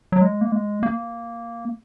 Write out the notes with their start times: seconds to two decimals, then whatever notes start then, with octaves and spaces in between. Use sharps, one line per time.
0.12 F#3
0.21 G#3
0.41 A#3
0.52 G#3
0.83 A#3